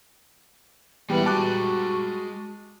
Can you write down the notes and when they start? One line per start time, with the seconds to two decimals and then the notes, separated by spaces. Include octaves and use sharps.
1.10 E3 G3 G#3 B3 F#5
1.26 F#4 A5 D6 F#6